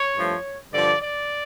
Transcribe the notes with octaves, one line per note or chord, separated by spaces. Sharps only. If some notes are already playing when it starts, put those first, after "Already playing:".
Already playing: C#5
G2 F3 A3
G2 D3 F3 D5
D5